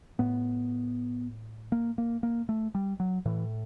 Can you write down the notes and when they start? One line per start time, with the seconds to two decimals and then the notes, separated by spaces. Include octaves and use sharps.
0.19 A2 B3
1.72 A#3
1.98 A#3
2.23 A#3
2.49 A3
2.75 G3
3.00 F#3
3.26 A2 E3